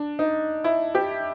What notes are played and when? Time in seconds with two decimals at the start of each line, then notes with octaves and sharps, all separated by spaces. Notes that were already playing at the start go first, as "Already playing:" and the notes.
Already playing: D4
0.19 D#4
0.64 E4
0.95 G4